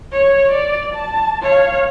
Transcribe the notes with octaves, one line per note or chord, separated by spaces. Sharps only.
C#5
D5
A5
C#5 F5